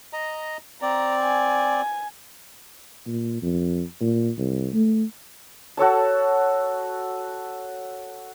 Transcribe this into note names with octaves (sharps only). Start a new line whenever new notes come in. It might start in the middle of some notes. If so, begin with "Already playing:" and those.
D#5 A#5
C4 D5 A#5
G#5
A#2
F2
A#2
C2
A3
F#4 A4 C#5 A5